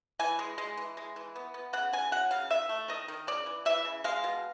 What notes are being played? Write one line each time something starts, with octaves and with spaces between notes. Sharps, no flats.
E3 G#5
G#3
G#3
E3
G#3
E3
B3
B3
C#3 F#5
C#3 G#5
F#3 F#5
C#3 F5
D#3 E5
A3
D#3 D#5
D#3
C#3 D5
E3
E3 E5
C#3
G#3 F5
B2